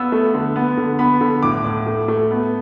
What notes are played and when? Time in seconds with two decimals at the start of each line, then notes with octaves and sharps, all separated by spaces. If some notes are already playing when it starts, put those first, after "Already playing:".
Already playing: B3 E6
0.12 A3
0.34 D3
0.56 B3
0.77 D3
0.99 B3 B5
1.21 D3
1.43 A2 D6
1.64 A2
1.86 A3
2.08 A3
2.31 B3